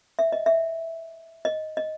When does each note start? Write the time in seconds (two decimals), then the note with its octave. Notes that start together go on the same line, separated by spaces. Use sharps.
0.19 E5
0.32 D#5
0.46 E5
1.45 D#5
1.77 D#5